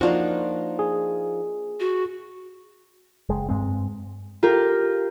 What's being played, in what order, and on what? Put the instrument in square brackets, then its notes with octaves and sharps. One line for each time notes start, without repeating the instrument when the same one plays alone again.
[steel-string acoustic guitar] F3 D#4 F4 [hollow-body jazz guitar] A#3 D4 F#4
[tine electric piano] G#4
[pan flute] F#4
[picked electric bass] F#1 G#3
G2 G#3 C4
[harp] F4 G4 A#4